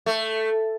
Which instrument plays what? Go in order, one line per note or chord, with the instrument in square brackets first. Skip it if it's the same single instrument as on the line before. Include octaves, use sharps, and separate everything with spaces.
[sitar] A3